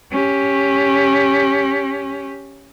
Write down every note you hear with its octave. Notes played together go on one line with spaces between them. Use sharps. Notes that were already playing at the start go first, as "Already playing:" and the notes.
C#4 G4